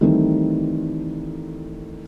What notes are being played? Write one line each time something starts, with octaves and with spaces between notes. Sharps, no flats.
D#3 E3 G3 A3 C4 D#4